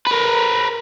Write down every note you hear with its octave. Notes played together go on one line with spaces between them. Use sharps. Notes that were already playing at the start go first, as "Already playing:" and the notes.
A#4 B4